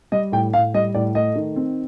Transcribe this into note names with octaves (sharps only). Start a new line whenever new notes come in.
G3 D#5
A2 G5
A2 F5
G3 D#5
A2 D5
A3 D#5
D#3
C4